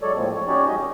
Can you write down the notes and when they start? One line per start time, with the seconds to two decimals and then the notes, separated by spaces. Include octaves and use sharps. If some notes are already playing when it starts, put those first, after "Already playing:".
0.02 F#3 G#3 A4 C#5 D5
0.16 A2 F3 G#3 A#3 C4
0.35 C#5
0.47 C#4 D#4 F#4 G4 C#5 D5
0.67 F#3 G#3 F#4 G4 D#5
0.79 D#3